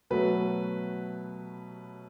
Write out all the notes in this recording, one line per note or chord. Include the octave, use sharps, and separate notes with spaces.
B2 F#3 A3 B4